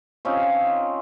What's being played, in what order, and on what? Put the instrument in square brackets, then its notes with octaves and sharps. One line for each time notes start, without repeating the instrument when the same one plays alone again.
[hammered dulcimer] C4 C#4 D#4 F4